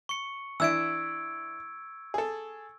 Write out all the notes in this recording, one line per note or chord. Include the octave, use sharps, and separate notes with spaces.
C#6 C#7
E3 D4 E5 E6 G#6 D7
G#4 A4